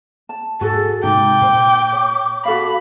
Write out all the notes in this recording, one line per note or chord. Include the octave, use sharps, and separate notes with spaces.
A5
G#2 F#4 G#4 A4
G#2 C3 G#3 D#4 G5 D6
A#2 C5
C#5
F#4 A4 F5 B5